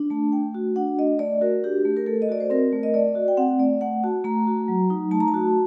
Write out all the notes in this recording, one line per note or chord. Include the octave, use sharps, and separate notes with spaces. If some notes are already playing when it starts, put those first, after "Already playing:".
Already playing: D4
A3 A5
A3 G5
F#4
D4 F#5
A3 D#5
A3 D5
F#4 A#4
D4 G4
A3
A#4
A3 A4
D#5
F#4 D5
C5
C4 A#4
A3
D#5
A3 D5
F#4
G5
C4 F#5
A3 D5
A3 F#5
F#4 A5
A3 A#5
F#4
F#3
D#4
A3 A5
A#5
A5
F#4